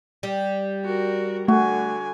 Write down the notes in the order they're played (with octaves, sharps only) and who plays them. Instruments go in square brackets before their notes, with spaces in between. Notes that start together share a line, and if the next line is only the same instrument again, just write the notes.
[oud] G3
[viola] F#4 A#4
[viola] D3 G#5 [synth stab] A3 [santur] F#4